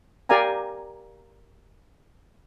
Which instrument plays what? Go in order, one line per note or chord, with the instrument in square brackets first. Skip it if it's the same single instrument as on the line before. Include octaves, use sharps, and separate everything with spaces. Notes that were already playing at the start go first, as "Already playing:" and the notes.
[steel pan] G4 A#4 D5 F5 G#5 A#5